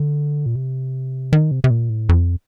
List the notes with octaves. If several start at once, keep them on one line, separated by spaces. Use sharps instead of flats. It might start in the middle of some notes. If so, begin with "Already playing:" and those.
Already playing: D3
A#2
C3
D#3
C3
C3
A#2
A2
F2